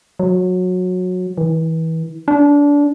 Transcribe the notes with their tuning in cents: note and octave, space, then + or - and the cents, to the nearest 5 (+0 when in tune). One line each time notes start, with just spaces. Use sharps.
F#3 -20
E3 -30
D4 -25